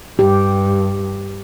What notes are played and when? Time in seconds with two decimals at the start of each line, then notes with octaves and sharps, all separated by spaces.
0.19 G2 G4